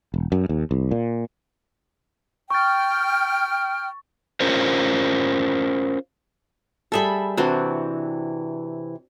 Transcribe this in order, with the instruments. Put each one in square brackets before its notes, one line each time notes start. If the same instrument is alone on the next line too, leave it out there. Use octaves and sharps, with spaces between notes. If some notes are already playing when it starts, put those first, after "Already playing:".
[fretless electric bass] E1
F#2
D#2
C2
A#2
[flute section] G5 F6 [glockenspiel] C#6 A6
[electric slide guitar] C#4 F4 A#4 C5
[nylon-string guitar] G3 G#4 A5 [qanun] A4 E5 B5
[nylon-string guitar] C3 E3 [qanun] C4 D4 F#4